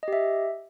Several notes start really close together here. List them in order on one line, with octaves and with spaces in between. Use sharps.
D#5 G4 E5